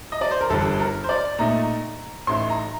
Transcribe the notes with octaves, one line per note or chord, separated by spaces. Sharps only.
D#5
D5
C5
A#4
G1 G2 D3 A4
A#4
C5
D5
A#2 A3 D#4 A#5
A1 A2 A3 D#4 C6
A#5